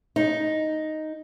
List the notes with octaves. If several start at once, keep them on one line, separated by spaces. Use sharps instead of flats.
D#4